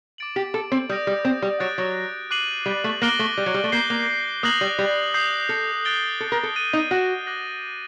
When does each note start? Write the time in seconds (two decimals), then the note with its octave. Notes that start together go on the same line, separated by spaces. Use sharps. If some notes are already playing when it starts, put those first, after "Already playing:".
0.18 D6 A6 D7 F#7
0.36 G4
0.54 A4
0.72 C4
0.89 G3 D#6 G6 A#6 D7
1.07 G3
1.25 C4
1.42 G3
1.60 F#3 F#6 A6 D7
1.78 F#3
2.31 D6 F#6 C7 D#7 F#7
2.66 G3
2.84 A3
3.02 A#3 D6 F#6 A#6 D7 G7
3.19 A3
3.38 G3
3.46 F#3
3.54 G3
3.64 A3
3.72 A#3 G6 C7 G7
3.90 A#3
4.43 A#3 D#6 F#6 A#6 F#7
4.61 G3
4.79 G3
5.14 D#6 G6 C7
5.49 A4
5.85 F#6 A6 D7 G7
6.20 A4
6.32 A#4
6.43 A4
6.55 F#6 A6 D#7 G7
6.73 D#4
6.91 F#4
7.27 D6 F#6 A#6 F#7